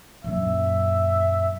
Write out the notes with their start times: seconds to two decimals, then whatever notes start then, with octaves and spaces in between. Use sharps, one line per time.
0.24 F#2 A#2 E5